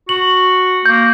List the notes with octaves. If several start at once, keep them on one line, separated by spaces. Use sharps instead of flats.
F#4 F#7
A#3 G6